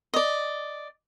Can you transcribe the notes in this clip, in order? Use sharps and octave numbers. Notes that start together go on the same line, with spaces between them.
D5 D#5